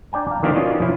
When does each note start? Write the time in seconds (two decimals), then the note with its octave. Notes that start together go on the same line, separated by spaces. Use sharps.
0.12 D4 D5 G5 G#5 A#5
0.28 F5 A5 A#5
0.43 D#3 E3 A#3 D4 G4 C5
0.55 D#3 C#4 F4 F#4 D5 D#5
0.80 C3 F3 E4